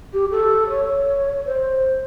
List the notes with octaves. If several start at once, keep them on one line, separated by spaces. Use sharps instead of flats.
G4
A4
C#5
C5